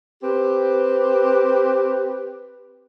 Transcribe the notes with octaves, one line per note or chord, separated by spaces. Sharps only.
C4 G4 B4